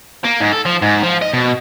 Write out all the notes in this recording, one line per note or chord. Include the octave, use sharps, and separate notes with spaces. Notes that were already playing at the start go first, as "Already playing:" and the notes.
A#3
G#2
A4
F3
G#2
F3
D#5
B2